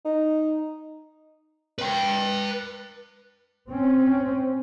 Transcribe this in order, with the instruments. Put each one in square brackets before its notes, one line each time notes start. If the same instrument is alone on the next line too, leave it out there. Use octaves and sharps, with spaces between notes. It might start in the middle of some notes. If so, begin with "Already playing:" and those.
[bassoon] D#4
[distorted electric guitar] B4 G5
[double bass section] C4 C#4